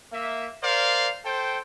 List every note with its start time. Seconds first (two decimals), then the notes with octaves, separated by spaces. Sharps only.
0.13 A#3 E5
0.64 A#4 C5 D5 F5
1.26 A4 C5 G5